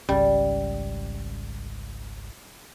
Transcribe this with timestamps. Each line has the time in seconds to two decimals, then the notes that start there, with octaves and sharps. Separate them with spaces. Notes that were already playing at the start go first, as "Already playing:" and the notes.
0.09 G#1 C#2 G3 C#4